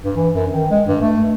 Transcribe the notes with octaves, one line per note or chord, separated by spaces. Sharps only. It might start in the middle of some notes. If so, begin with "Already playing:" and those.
G2
E3
F#2
D#3
G#3
G2
A3